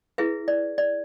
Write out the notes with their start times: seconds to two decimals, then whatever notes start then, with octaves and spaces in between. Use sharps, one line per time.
0.18 E4 G#4 B4 E5
0.48 D5
0.78 D5